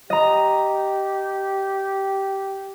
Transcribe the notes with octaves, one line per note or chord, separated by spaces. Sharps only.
G4 D#5 A#5